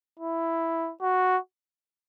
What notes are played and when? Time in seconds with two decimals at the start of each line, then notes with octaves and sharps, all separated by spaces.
0.19 E4
1.01 F#4